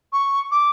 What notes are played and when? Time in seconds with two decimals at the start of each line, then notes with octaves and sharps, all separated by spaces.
0.13 C#6
0.51 D6